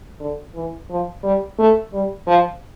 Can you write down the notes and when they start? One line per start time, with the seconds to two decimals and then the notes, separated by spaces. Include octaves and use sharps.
0.20 D3
0.54 E3
0.90 F3
1.23 G3
1.59 A3
1.93 G3
2.27 F3